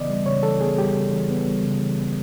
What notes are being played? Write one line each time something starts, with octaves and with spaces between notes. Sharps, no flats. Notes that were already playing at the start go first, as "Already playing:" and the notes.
Already playing: C#3 E3 B3 D5 D#5
G3
C#3 C#5
E3 A4
B3 G#4
G3 G4
C#3
E3
B3
G3
C#3
E3
B3